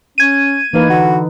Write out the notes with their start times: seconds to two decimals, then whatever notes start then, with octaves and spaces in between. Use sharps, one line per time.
0.18 C#4 G#6 D#7
0.73 E3 A#3 D#4 B4
0.90 D3 F#4